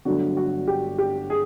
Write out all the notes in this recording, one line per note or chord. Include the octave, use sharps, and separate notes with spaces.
G1 G2 D3 F#3 A3 F#4
F#4
G4
G4
G#4